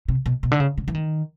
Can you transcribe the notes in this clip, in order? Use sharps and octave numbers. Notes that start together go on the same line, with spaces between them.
C3
B2
B2
D3
C#3
C#3
E3
D#3